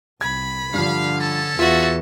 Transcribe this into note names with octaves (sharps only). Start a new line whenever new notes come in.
C2 B5 G#6
G2 D3 F3 F5
C#4 A4 A5
E2 F4 F#4 E5